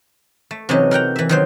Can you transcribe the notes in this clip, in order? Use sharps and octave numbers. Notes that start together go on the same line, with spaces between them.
A3
C3 E3 F#3 C#4 D#4
A#4 F#5 G5 A#5
E3 E5
D#3 F#3 C5